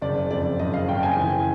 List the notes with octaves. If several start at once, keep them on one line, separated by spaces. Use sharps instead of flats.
F#1 D5
F2 D5
F#1 D#5
F5
F#1 G5
G#5
E3